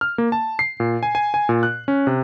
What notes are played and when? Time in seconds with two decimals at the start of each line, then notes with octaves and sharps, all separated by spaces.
0.01 F6
0.18 A#3
0.32 A5
0.59 C7
0.80 A#2
1.03 G#5
1.15 G#5
1.34 G#5
1.49 A#2
1.63 F#6
1.88 C#4
2.07 C3